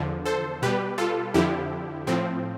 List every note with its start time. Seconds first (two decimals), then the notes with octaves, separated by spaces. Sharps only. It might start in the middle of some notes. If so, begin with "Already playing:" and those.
Already playing: E2 D3 F3
0.25 A4 C5
0.62 B2 G3 G4 B4
0.98 F4 A4
1.34 F2 D3 F3 E4 G4
2.07 A2 F3 C4